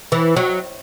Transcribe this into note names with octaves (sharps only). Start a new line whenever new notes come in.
E3
F#3